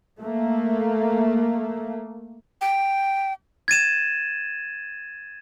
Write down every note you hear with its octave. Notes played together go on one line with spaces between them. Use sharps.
A3 A#3
G5
G#6 A6 D#7 E7